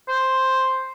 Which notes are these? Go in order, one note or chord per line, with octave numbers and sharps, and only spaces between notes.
C5